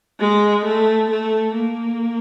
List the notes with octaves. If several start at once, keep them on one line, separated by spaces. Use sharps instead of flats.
G#3
A3
A3
A#3